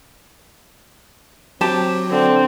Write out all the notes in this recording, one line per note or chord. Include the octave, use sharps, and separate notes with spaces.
F#3 C4 G4 A5
D3 C4